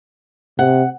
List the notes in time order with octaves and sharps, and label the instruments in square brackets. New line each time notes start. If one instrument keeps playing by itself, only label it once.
[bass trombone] C3 [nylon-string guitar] F#5